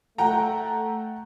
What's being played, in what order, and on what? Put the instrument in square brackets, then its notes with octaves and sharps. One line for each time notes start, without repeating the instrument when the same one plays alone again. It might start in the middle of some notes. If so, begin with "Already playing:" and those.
[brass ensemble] A3 [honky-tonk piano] F#5 G5 A#5